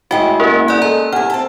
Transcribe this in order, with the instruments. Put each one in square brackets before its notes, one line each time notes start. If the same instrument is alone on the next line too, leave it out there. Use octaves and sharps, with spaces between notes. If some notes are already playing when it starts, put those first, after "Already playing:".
[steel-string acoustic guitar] A2 G#3 B3 [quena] E4 [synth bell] F#4 [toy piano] F5 G5
[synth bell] A#3 C#4 [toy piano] G4 A#4 D#5
[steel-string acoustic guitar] B3 G#4 [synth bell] D5 F#6
[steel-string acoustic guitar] G#3 [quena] A4 [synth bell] A#5
[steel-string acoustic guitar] G2 E4 [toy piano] F#5 [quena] G#5 [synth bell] F6
[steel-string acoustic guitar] C4 A4 [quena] A5